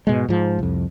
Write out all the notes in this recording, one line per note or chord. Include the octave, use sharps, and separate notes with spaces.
G#2 B2 G#3
G#2 F3
C2 F2